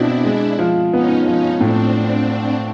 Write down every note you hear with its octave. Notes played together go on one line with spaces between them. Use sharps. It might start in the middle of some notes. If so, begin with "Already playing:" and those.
Already playing: B2 C4 D4 E4
G#3
F3
B3 C#4 D#4
F3 C#4 D#4
A2 C4 D4